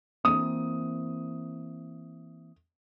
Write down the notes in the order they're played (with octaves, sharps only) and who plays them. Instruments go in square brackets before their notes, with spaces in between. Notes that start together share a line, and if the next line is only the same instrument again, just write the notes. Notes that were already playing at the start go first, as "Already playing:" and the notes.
[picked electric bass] E3 A#3 C4 [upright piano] D#6